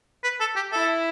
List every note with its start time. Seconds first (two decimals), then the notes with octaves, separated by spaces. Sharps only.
0.24 B4
0.40 A4
0.56 G4
0.72 E4 A4